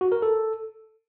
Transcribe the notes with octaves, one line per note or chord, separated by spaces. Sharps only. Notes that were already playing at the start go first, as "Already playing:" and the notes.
F#4
A#4
A4